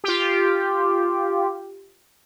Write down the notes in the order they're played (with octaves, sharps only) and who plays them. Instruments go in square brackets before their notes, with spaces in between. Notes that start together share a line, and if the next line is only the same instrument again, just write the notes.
[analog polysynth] F4 G4